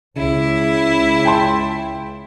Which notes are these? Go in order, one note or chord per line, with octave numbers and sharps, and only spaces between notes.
C#2 C#3 E4
G5 A5 C6